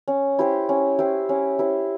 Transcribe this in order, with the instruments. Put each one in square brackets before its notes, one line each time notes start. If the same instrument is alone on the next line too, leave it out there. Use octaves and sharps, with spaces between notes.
[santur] C#4
E4 G4 C5
C#4
E4 G4 C5
C#4
E4 G4 C5